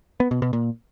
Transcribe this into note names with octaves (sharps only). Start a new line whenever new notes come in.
B3
B2
B2
A#2